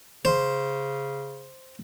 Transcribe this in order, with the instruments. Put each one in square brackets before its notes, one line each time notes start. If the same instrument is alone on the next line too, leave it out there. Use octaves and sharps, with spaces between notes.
[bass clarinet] C#3 [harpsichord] C5